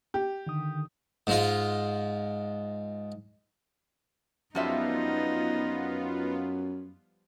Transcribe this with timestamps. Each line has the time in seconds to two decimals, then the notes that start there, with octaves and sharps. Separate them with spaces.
0.14 G4
0.47 D3 D#3 D#6
1.27 G#2 G#3 F4
4.55 F#2 F3 G3 B3 D#4 F4 E5